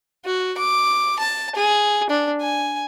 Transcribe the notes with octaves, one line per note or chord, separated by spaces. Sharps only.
F#4
D6
A5
G#4
D4
G#5